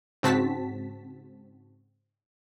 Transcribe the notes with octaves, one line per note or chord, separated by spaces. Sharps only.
G#2 C#3 C4 F#4 A5 B6